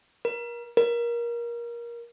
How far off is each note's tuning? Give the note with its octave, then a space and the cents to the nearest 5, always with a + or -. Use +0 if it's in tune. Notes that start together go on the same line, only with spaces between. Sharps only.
A#4 +30
A#4 +20